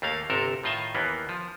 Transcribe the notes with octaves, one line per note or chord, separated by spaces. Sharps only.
D#2 A3 A#3 F5
G1 C3 A4 A#4
A2 D#3 F4 D#5 G#5 A5
D#2 E3 A#3 B3
F3